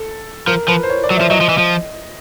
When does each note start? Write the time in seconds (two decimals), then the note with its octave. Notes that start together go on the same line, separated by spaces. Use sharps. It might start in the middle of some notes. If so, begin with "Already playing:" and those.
Already playing: A4
0.47 F3 A#4
0.68 F3 B4
0.83 C5
0.90 C#5
1.03 D5
1.10 F#3
1.17 F3 E5
1.31 F#3 D#5
1.41 F3
1.49 E3
1.58 F3